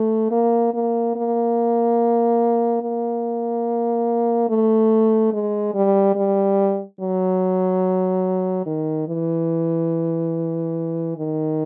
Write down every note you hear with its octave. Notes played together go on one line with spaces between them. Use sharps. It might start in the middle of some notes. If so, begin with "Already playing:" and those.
Already playing: A3
A#3
A#3
A#3
A#3
A3
G#3
G3
G3
F#3
D#3
E3
D#3